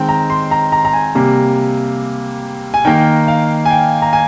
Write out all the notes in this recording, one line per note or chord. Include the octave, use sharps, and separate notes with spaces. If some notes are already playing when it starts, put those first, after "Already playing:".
Already playing: D#3 G#3 C4 G5
A#5
C6
A#5
A#5
A#5
G#5
C3 G3 A#3
G#5
D#3 A#3 G5
F5
G#5
G5
A#5
G#5